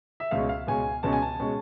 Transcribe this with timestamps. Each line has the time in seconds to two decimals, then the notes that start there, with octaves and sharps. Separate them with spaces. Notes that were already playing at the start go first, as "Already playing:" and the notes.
0.20 E5
0.31 C#2 B2 G#3 C#4 F5
0.49 F5
0.67 C#2 B2 G#3 C#4 G#5
1.03 C#2 B2 G#3 C#4 A5
1.13 G#5
1.22 A5
1.40 B2 G#3 C#4